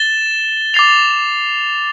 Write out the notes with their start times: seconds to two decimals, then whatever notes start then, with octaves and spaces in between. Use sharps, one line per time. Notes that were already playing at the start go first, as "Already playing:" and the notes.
Already playing: A6 E7 G7
0.74 D6 A6 C7 F7